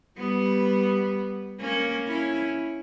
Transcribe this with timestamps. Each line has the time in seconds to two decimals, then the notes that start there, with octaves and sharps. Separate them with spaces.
0.18 G3 B3
1.60 A#3 C#4
2.07 C#4 E4